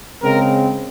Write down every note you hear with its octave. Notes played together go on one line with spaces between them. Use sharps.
C#3 G#3 C4 A#4